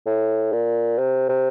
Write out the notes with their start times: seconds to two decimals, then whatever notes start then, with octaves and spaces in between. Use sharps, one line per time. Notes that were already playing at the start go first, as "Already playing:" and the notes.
0.06 A2
0.53 A#2
0.98 C3
1.29 C3